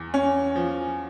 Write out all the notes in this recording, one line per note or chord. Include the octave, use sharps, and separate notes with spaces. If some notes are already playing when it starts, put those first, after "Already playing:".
Already playing: E2
C#4
F3